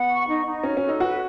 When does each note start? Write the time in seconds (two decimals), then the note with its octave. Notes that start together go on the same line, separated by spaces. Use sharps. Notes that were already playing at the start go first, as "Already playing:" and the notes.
Already playing: B3 F#5
0.08 C#6
0.27 D#4
0.46 D#4
0.64 C#4 F#4
0.77 C#4
0.83 A4
0.89 D#4
1.00 F#4 B4